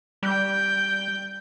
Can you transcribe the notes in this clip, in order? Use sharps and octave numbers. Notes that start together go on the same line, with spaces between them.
G3 G5 G6